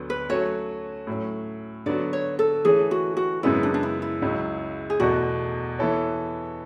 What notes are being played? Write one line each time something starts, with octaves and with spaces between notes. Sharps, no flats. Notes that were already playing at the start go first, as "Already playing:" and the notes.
Already playing: D2 D3 F#3 B3
B4
F#3 A3 C#4 F#4 C#5
A2 F#3 C#4
D3 F#3 B3 F#4 D5
C#5
A4
E3 A3 C#4 G#4
F#4
F#4
F#2 C#3 G#3 B3 E4
D4
D4
E4
E4
C#2 C#3 F#3
G#4
E2 B2 A3 F#4
E3 B3 E4 A4 C#5